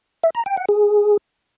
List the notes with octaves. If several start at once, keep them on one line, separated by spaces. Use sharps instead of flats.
E5
A#5
G5
F#5
G#4